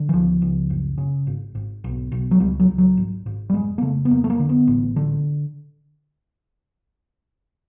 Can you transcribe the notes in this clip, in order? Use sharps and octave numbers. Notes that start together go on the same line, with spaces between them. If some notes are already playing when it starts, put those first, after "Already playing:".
Already playing: D3
E3
C#2 F3
C#2
F#1
C#3
G#1
G#1
B1
B1
F#3
C#2 G3
F#3
C#2
F#3
G#1
G#1
G3
F1 G#3
A#3
C#3 A3
B3
F1 A#3
A3
A#3
D3
B3
A1
D3